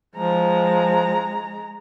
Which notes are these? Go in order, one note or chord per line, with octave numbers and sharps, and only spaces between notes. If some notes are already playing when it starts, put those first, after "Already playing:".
F3 G#3 A#5